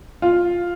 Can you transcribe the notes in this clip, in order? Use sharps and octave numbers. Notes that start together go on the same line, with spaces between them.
F4